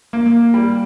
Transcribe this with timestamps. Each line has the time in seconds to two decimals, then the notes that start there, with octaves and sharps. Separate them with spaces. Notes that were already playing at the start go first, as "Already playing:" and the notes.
0.13 A#3
0.54 G3